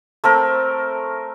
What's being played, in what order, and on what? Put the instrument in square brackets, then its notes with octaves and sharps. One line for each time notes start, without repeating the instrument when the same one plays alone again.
[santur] A3 C4 A#4